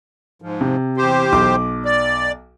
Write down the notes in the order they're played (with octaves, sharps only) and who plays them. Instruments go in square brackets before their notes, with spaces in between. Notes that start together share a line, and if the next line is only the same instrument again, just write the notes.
[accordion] G#2 F3
[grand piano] C3
[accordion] E2 G4 C5
[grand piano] B1 D6
[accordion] D5